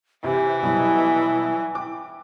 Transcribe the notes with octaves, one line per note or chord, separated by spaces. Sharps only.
C3 E3 G4
B2 F#3 G3 E4
G5 D6